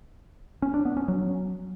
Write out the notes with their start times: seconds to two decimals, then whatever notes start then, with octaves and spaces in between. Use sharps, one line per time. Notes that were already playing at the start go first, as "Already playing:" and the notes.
0.62 C#4
0.74 D4
0.85 B3
0.97 C#4
1.08 F#3